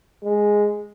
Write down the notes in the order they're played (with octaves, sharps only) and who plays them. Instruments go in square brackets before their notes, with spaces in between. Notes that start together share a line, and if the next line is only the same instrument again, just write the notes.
[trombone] G#3